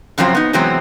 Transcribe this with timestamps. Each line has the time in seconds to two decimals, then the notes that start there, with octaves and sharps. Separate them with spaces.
0.18 F#2 C#3 F3 F#3 C4 F5
0.35 B3 D#4
0.53 C3 E3 F#3 G#3 B3 C4